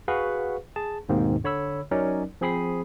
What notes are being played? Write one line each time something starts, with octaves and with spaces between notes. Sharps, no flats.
F#4 G#4 B4 F5 F#5 C#6
G#4 A5
D#2 G#2 B2 D#3 A#3 C4
D3 C#5 B5 E6
F#3 C#4 D#4 A#4 D5
F3 C4 G#4 B5 D#6 C7